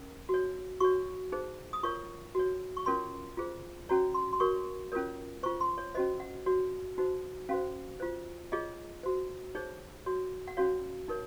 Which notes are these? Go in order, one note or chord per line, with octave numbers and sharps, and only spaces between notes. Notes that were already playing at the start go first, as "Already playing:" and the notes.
Already playing: C#4 A#4
F#4 C#5
F#4 C#5 C#6
D#4 G#4 C5
D#6
F4 A#4 C#5 C#6
F#4 C#5
C#6
C#4 F4 A#4 C#5 C6
F4 G#4 C5
C#4 F#4 C#5 A#5
C6
C6
F#4 A#4 C#5 C#6
C#4 F4 A#4 C#5
F4 C5 C#6
C6
C#5
C#4 F#4 C5 D#5
F#5
F#4 C#5
D#4 F#4 C5
C#4 F#4 C5 F5
F4 C5
F4 G#4 C#5 D#5
F#4 C5
D#4 G#4 C5 C#5
F#4 C#5
F#5
C#4 F#4 C#5 F5
D#4 A#4 C#5